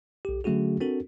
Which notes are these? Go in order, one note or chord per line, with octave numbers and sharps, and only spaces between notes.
B1 G4
D3 F#3 A3 C#4 F#4 G#4
C4 D4 F#4 A4 A#4